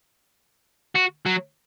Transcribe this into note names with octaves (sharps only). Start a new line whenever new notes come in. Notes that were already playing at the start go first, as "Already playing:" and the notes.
F#4
F#3